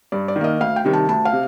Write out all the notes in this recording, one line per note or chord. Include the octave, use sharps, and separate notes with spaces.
G2 D5
D5
D#3
A#3 D#5
D2 F5
G5
C3 D#3 G3
A5
D2 A5
F5
C3